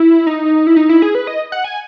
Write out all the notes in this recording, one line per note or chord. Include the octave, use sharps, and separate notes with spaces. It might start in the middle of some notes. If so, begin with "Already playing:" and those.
Already playing: E4
D#4
E4
D#4
E4
G#4
B4
D#5
F#5
G#5